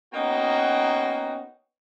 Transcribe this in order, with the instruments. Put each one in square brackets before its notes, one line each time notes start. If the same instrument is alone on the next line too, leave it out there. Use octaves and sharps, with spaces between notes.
[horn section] A#3 B3 C#4 D#4 F#4 G5